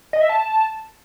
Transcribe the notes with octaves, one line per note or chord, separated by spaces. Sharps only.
D#5
E5
A5